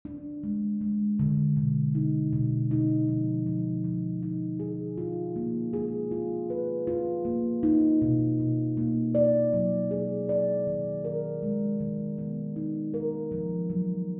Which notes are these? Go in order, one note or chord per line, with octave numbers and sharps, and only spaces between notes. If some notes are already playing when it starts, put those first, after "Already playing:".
D4
G#3
G#3
D3
B2
D#4
B2
D#4
F3
F3
F3
D#4
G#4
F4
A#3
G#4
F4
B4
F4
A#3
D#4
B2
B2
A#3
D5
F#3
G#4
D5
D#3
A#4
G#3
D#3
B3
D#4
A#4
F3
F#3